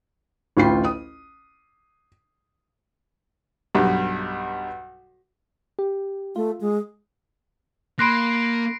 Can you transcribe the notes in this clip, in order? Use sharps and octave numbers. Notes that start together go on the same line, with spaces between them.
A1 D2 F4 G5 C7
D#6
B1 G2
G4
A3 F4
G#3
A#3 B5 C6 F#6 A#6 C7 D7